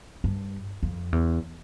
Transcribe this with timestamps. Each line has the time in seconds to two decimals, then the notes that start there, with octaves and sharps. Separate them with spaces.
0.24 G2
0.83 F2
1.12 E2